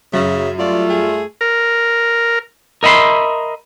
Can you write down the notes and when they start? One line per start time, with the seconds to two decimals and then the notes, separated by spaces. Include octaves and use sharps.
0.14 F#2 C#3 E5
0.59 G3 A3 F4 D5
0.90 G#4
1.41 A#4
2.83 A#4 D#5 E5 B5 C6